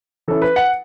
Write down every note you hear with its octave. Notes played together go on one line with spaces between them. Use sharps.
E3 C#4 E4 A4
B4
F#5